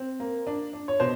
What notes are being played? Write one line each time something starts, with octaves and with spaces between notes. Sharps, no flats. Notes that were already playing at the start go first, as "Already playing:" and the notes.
Already playing: C4
A#3
D4
D4
C#5
B2 C5